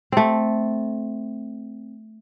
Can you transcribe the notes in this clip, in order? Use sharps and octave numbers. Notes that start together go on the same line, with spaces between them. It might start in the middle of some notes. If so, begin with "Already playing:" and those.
A3 C4